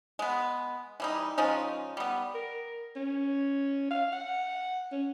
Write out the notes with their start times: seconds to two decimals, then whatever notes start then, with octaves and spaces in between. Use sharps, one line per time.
0.19 G#3 B3
1.00 E3 G3 D#4
1.38 F3 G#3 C#4 D#4
1.97 G3 B3
2.34 A#4
2.96 C#4
3.90 F5
4.12 F#5
4.92 C#4